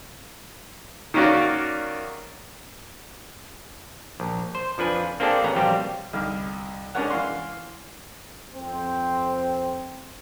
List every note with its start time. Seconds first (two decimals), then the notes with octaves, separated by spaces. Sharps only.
1.14 D#3 A#3 C#4 F#4 D5
4.20 A#1
4.55 C5
4.78 F2 F3 D4 B4 G#5
5.20 A#3 C4 D4 G#4 A4 D5
5.44 A1 B3 C#4 A#5
5.55 A#1 B2 G3 C4 G4 F5
6.13 C2 D3 D#4 F6
6.95 G#3 C#4 D4 A#4 C#5 F#5
7.10 E3 F5 C6
8.54 F2 C4 C5